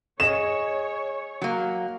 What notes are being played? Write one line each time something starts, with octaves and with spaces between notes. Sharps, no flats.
G#4 C#5 D#5 E7
F#3 A#3